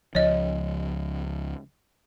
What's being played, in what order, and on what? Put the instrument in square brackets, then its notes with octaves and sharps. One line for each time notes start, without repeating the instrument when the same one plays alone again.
[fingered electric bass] C#2 F3 [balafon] C#5 D#5